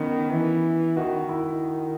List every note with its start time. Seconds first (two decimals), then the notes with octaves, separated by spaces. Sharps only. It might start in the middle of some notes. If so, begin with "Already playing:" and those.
Already playing: D#3 B3 C#4
0.31 E3
0.97 D#3 F#4
1.29 E4